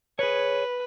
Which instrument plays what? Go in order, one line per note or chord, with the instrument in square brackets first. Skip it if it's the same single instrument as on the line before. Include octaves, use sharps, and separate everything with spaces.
[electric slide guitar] G#4 C#5 [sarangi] B4